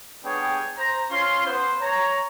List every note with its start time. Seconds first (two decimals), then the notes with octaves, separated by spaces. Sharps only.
0.24 G3 B3 D4 G#4 C#5 G5
0.77 C5 A#5
1.10 C#4 F4 C6
1.46 B3 C5
1.81 C#5 A#5